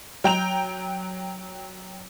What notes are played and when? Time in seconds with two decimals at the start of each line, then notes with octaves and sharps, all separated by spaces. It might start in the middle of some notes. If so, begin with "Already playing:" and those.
0.24 F#3 G5 A#5 F7